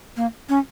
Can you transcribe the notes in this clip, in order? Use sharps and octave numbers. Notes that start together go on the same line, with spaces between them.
A#3
C#4